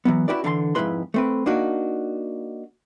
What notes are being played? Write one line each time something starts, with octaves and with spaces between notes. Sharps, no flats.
E3 F#3 B3
C#4 E4 F#4 G4 B4 D5
D3 E3 A5 C6
F2 G#2 G#3 E4 B4 C6
A3 C4 B4
A#3 D4 D#4 F#4